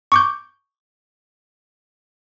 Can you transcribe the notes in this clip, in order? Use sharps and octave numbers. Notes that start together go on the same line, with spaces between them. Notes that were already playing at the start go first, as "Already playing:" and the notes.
C#6 D6 G6